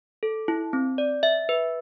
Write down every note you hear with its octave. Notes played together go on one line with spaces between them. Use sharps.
A4
E4
C4
D5
E5
B4